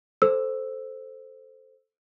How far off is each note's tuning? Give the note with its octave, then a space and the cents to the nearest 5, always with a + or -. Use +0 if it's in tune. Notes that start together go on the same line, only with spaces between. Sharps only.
A4 +0 C5 +0 E6 +0